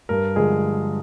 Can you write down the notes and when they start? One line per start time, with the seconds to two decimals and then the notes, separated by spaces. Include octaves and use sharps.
0.09 G2 A#4
0.36 D3 F3 G#3 G#4